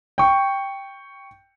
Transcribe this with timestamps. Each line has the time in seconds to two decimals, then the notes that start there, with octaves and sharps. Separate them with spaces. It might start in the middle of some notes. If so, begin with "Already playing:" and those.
0.18 G5 C#6